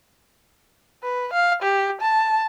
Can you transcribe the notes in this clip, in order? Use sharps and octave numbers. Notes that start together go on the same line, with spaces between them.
B4
F5
G4
A5